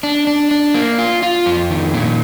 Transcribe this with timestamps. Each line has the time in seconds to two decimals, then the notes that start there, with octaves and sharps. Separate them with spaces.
0.03 D4
0.27 D4
0.51 D4
0.74 A#3
0.98 F4
1.23 F4
1.46 F2
1.70 D#3
1.94 A#2